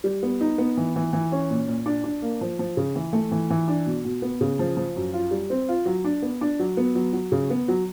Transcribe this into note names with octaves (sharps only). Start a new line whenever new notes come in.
G3
B3
D#4
B3
E3
E3
E3
C#4
A#2
A#2
D4
D4
A#3
F3
F3
C#3
E3
A3
E3
E3
D4
B2
B2
B3
C#3
F3
F3
F#2
F4
G3
C4
F4
F#3
D4
B3
D4
F#3
B3
F#3
F#3
C#3
B3
F#3